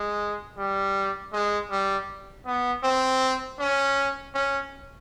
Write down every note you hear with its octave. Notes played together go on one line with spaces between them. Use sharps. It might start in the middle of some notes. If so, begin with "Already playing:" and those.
Already playing: G#3
G3
G#3
G3
B3
C4
C#4
C#4